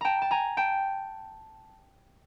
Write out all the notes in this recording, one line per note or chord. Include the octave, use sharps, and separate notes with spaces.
G5 A5 A#5
A5
G#5 A#5
G5 A5